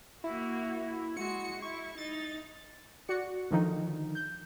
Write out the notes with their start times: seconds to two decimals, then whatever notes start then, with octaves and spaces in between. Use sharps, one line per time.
0.24 A#3 E4 F#4
1.17 G#3 F#4 C#7
1.62 E4 C#6
1.98 D#4 A6
3.08 F#4 D5 C#7
3.51 D3 D#3 F3 D#4
4.15 G6